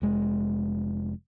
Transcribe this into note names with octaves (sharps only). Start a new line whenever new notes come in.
F1 G#3